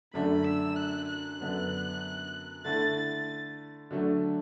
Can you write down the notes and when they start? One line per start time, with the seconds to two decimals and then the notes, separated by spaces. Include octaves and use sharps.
0.14 F#2 D3 A3 D4 B5
0.45 E6
0.76 F#6
1.08 F#6
1.40 F#2 D3 B3 D4
2.65 D3 A3 E4 A6
2.97 A6
3.91 D3 F#3 A3 D4